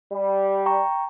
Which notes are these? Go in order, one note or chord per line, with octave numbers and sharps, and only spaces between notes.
G3
G5 A#5 C#6